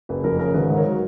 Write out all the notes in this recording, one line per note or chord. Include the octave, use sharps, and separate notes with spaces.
F#1 B4
F2 A#4
C#3 A#4
G#1 B4
G#2
A#4 C#5
F#3